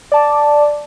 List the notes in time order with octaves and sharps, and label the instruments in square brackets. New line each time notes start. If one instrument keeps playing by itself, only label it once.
[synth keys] D5 A5 D6